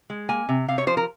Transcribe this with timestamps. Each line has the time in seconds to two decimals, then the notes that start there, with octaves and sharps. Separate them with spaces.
0.10 G#3
0.29 A#3 G#5
0.49 C3
0.68 C3 F5
0.78 C#5
0.87 F3 C5
0.97 A#4